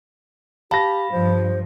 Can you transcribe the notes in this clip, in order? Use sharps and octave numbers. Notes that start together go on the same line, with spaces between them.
G4 F5 A5 B5 A#6
G2 F3 C5